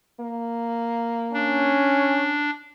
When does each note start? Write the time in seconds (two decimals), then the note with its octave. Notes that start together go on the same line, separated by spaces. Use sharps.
0.20 A#3
1.33 C#4 D4